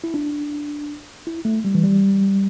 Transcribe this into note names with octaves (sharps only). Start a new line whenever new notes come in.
E4
D4
E4
A3
G3
E3
G3